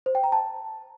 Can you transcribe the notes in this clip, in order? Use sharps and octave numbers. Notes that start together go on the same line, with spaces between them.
C5
G5
A#5
A5